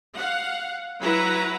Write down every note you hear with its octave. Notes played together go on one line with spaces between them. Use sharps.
F5 F#5
F#3 E4 B4 F#5 A#5